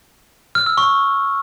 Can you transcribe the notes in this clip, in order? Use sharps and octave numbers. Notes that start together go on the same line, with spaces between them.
F6
E6
C#6